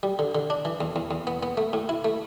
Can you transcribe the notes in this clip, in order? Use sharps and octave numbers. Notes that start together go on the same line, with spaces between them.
G3
D3
D3
D4
E3
E2
E2
E2
B3
B3
A3
A2
E4
A3